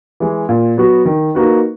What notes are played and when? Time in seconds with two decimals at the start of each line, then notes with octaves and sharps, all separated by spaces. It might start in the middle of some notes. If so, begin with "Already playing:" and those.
0.20 E3 G#3
0.49 A#2
0.78 F#3 B3 F#4
1.05 D#3
1.35 A#3 D#4 F#4 B4